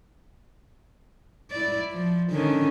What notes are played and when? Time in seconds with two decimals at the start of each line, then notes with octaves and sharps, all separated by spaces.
1.51 E4 D5
1.92 F3
2.31 D3 D#3 C#4